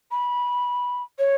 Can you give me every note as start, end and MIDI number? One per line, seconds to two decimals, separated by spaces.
0.11 1.02 83
1.18 1.35 73